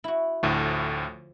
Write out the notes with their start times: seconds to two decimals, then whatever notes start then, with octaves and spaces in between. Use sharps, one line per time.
0.04 E4 F#4
0.43 D2 A2 F3 A3